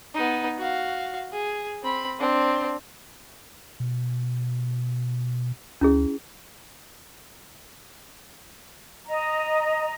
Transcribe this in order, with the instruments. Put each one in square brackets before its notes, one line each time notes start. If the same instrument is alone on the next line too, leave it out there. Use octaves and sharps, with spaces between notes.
[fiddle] B3 D#4
F#4 F5
G#4
C4 B5
C4 D4
[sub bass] B2
[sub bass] D2 [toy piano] C#4 E4 G#4
[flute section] D#5 A#5